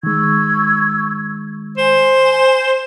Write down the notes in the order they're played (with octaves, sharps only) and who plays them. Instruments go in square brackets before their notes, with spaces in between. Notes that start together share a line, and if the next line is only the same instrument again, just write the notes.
[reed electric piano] D#3 G#3 [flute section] C#6 E6 G#6
[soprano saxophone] C5 [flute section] G#5